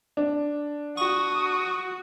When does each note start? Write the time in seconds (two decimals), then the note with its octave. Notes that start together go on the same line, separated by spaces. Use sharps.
0.17 D4
0.97 F#4 C#6 D#6